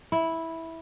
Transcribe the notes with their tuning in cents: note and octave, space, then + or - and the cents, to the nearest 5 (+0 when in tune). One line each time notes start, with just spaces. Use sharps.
E4 -10